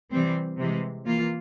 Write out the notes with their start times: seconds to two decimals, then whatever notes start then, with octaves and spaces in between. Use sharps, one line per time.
0.12 C3 E3 G3 C4
0.58 C3 E3 G#3
1.05 E3 A#3 F4